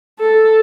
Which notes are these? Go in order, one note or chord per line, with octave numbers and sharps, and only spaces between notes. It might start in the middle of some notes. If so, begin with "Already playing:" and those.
A4